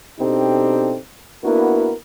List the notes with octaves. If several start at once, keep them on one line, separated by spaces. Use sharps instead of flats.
B2 C4 D4 D#4 G4 A4
A#3 B3 D4 E4 F#4 A#4